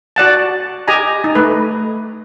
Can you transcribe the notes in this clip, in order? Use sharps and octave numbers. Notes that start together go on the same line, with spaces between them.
F#4 D5 F#5 A5
G4 D#5 G#5 A#5
D#4
A3 B4